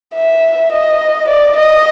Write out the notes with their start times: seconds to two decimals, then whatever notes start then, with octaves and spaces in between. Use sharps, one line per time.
0.15 E5
0.71 D#5
1.27 D5
1.56 D#5